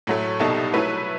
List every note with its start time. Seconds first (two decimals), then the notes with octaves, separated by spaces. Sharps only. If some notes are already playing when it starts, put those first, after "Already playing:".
0.07 A2 F#3 A3
0.40 C2 B2 G3 D#4 A4
0.74 F#3 A3 E4 B4